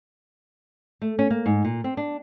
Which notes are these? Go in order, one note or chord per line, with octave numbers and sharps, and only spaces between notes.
A3
C#4
A#3
G#2
A#2
C4
D4